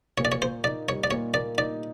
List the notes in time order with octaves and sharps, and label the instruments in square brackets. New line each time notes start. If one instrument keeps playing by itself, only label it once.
[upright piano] A#2 [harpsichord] C#5
[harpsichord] D5
C#5
[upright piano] A#3 [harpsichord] C5
[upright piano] D#4 [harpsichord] D5
[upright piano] G3 [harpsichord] C#5
[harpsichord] D5
[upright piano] A#2 [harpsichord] C#5
[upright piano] A#3 [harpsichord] D5
[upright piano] D#4 [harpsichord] D5